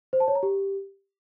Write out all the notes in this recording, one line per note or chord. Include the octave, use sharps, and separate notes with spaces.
C5
A5
C#5
A#5
G4